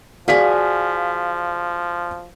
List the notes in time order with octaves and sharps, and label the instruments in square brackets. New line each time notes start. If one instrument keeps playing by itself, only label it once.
[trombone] F3 [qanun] F#4 G#4 [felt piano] D5 F5 B6